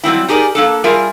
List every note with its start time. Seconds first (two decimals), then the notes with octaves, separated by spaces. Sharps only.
0.03 F#3 G3 C4 E4
0.28 D#4 G4 G#4 A#4 D5
0.55 A#3 D4 A4
0.84 G3 F4 G#4 A#4 E5